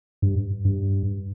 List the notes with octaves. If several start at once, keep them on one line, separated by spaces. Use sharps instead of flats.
G2
G2